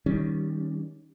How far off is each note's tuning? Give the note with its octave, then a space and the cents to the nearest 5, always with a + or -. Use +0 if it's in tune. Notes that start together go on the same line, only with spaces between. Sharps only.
D#3 +15 G3 +0 C#4 +0